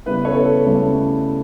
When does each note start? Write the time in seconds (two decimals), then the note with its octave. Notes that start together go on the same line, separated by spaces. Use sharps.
0.06 C#3 G3 B3 E4 B4
0.25 A4 C#5
0.35 A4
0.64 D2 C#3 G3 C#4 E4